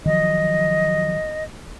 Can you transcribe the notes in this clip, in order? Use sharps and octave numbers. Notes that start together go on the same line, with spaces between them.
D#3 F3 F#3 D#5